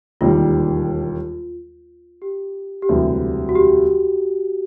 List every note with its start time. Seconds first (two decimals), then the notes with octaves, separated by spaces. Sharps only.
0.21 E1 D#2 D#3 G3 F4
2.22 G4
2.82 G4
2.89 E1 D2 C3 E3 G3 F#4
3.49 F#4
3.56 G4